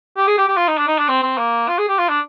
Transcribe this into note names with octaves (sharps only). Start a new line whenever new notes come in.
G4
G#4
G4
G4
F4
D#4
D4
D#4
D4
C4
C4
A#3
F4
G#4
G4
F4
D4